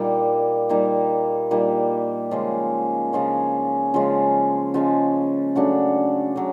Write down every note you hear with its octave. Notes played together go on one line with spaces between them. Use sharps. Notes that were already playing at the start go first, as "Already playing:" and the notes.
Already playing: A#2 G3 A#3 D#4
A#2 G3 A#3 D#4
A#2 G3 A#3 D#4
C#3 F3 G#3 C#4
C#3 F3 G#3 C#4
C#3 F3 G#3 C#4
C#3 F3 G#3 C#4
C#3 F#3 A3 D4
C#3 F#3